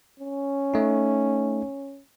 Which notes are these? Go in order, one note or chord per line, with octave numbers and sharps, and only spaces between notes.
C#4
A3 D#4